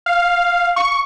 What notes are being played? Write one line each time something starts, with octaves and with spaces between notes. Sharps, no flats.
F5
C#6